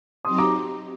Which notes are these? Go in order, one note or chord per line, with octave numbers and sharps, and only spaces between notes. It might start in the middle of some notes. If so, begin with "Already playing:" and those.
F#3 C4 D#4 G4 C6 D#6
A#5 D6